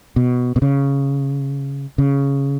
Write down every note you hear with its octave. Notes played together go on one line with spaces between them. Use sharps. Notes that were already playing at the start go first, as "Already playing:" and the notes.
B2
B2
C#3
C#3